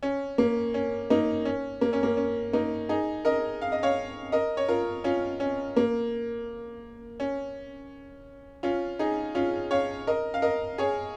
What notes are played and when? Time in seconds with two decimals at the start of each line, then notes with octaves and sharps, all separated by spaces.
0.03 C#4
0.38 A#3
0.74 C#4
1.10 A#3 D#4
1.45 C#4
1.81 A#3
1.93 C#4
2.03 A#3
2.17 C#4
2.53 A#3 D#4
2.89 D#4 G#4
3.25 A#4 D#5
3.62 F5
3.72 D#5
3.83 C#5 F5
4.32 A#4 D#5
4.57 C#5
4.69 F4 A#4
5.04 C#4 F4
5.40 C#4
5.77 A#3
7.20 C#4
8.63 C#4 F4
8.99 D#4 G#4
9.35 C#4 F4
9.71 C#5 F5
10.07 A#4 D#5
10.34 F5
10.42 A#4 D#5
10.78 G#4 C#5